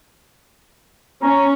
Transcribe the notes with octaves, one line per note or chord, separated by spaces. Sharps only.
C#4 A#5